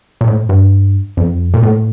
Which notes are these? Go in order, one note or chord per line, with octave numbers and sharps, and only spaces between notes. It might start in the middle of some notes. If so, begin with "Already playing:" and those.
A#2
A2
G2
F2
A#2
A2